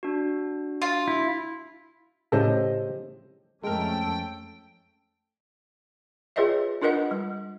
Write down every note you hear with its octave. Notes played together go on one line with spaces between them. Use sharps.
D4 F#4
F4
E4
A2 C#3 G4 A4 C5 D#5
F2 G#3 A3 C#4 A4 A#4 G5
F4 G#4 B4 C#5 D#5 E5
D4 F4 A#4 B4 D#5 F#5
G3